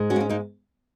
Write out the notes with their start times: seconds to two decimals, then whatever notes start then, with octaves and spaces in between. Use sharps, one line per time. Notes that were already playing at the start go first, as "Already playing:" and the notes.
Already playing: G#2 G#3
0.10 C#4 F#4
0.16 A#3
0.20 C#4
0.29 A#3 D#4